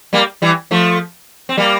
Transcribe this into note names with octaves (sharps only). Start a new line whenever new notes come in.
G3 A#3
E3 G3
F3 A3
C4
G3 A#3